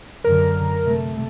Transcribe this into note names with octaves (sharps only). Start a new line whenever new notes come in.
F#2 D3 A#4
C3 A3